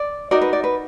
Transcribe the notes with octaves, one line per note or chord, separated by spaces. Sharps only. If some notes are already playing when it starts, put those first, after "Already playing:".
Already playing: D5
D#4 F#4 A#4 D5
B4
D5
B4